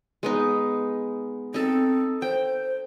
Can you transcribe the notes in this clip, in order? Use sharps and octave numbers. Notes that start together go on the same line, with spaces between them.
G#3 B3 D#4
C4 D#4 A4
C5 G5